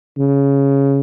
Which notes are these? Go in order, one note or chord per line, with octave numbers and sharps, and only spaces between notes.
C#3